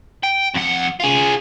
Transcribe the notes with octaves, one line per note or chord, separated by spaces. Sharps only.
G5
F2 F#5
F4 G#4